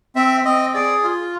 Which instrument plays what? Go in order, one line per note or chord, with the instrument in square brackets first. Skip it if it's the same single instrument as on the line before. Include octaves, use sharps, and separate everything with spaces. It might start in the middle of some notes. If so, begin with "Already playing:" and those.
[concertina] C4 E5
C4 D#5
G#4 D5
F4